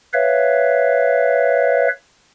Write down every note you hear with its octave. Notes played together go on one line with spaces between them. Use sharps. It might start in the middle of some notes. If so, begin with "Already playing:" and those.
B4 C#5 E5 F5